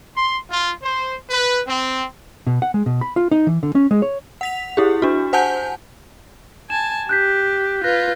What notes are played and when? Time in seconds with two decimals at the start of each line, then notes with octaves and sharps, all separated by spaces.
0.14 C6
0.49 F4
0.82 C5
1.30 B4
1.66 C4
2.47 B2
2.62 F#5
2.74 G#3
2.86 B2
3.01 B5
3.16 F4
3.31 D#4
3.47 E3
3.63 D3
3.75 C#4
3.91 G#3
4.02 C#5
4.41 F#5 B6 F7
4.77 E4 G4 G#4
5.02 D4 F#4
5.33 C5 F#5 G#5 A5 G6
6.70 G#5 A5 E7
7.09 G4 F#6 G6 B6
7.84 F4 B4 F#6 A#6